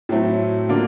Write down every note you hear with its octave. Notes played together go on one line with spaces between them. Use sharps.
A2 F#3 A3 C4
D3 F#3 A#3 D4 F4